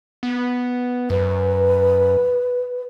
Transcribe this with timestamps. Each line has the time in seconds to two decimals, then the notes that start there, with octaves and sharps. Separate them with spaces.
0.23 B3
1.10 F#2 B4